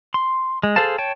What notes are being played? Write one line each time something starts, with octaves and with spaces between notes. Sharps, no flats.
C6
G#3
G#4 A4 C5 F5 A5
C#5 G5 A5